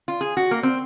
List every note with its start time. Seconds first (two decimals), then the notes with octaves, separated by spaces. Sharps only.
0.08 F4
0.21 G#4
0.37 F#4
0.51 A#3
0.63 C4